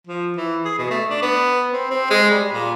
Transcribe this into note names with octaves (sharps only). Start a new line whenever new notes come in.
F3
E3
G#4
B2
A3
D4
B3
C4
C4
G#3
G3
A#2